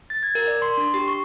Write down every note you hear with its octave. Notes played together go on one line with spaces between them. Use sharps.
A6
G#6
A#4
D5
C6
D4
G4
C#6